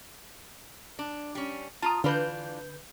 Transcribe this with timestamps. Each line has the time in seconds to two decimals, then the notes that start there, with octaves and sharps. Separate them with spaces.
0.99 D4
1.35 G3 C#4
1.82 F4 A5 A#5 D#6
2.04 D3 E3 D4 F4 B4 G6